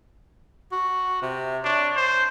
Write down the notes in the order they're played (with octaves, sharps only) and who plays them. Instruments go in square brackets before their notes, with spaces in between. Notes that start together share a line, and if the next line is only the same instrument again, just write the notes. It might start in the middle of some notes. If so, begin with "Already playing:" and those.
[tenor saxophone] F#4
C3
[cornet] D4 [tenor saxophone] C#5
[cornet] C5